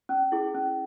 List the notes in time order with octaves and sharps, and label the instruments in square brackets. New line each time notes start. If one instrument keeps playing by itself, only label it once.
[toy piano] C#4
E4 G#4
C#4